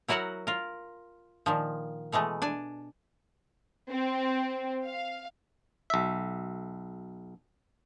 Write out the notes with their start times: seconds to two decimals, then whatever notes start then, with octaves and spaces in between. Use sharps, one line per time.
0.08 F#3 E4 F#4 A#4 F#5
0.47 F4 A#4
1.46 A#2 D#3 F3
2.12 B2 E3 G#3 A3
2.42 D4 G#5
3.91 C4
4.86 F5
5.90 B1 E5